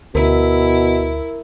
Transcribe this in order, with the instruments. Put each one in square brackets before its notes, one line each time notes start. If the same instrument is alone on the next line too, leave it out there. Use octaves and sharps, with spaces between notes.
[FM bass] D2 [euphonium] B2 [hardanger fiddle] E4 [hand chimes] A#4